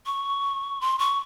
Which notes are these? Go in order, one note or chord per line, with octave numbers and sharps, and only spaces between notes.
C#6
C6
C#6